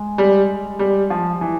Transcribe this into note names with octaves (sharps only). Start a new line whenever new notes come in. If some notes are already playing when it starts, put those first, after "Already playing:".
Already playing: G#3
G3
G3
F3
E3